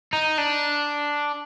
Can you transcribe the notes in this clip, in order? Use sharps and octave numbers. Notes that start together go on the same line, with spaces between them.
D#4
D4